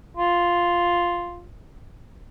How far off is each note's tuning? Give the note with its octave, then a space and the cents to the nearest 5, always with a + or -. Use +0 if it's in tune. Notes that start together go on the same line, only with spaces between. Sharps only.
F4 +0